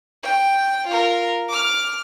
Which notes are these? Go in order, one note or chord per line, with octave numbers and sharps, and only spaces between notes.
G5
F4 A#4
D6 F6